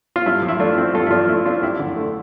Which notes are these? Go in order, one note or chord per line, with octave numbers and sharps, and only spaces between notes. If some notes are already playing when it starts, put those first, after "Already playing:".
F4
G2 E4
F3
E4
A3 D4 F4
C4
G2 F4 A4
E4
F3 D4 F4
A3 E4
C4 D4 F4
F2 E4 G4
D3
A3